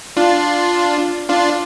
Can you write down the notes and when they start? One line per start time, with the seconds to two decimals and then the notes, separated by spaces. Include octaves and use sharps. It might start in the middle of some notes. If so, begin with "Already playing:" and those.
0.17 D4 F4
1.29 D4 F4